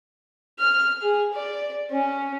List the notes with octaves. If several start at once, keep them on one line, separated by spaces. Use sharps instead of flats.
F6
G#4
D5
C#4